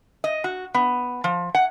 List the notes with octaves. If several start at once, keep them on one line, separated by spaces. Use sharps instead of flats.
D#5
F#4
B3
F3
F#5